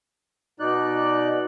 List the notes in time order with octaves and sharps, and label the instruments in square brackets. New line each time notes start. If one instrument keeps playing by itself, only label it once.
[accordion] B2 D#4 D5 F#6